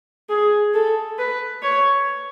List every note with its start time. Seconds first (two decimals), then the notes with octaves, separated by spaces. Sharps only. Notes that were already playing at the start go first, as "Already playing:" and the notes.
0.29 G#4
0.74 A4
1.18 B4
1.62 C#5